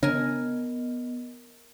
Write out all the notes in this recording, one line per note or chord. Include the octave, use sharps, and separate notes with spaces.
C#3 B3 D4 A#4 D#5 G#5